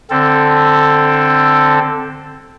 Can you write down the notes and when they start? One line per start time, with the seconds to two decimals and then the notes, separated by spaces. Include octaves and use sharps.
0.10 D3 C4 A4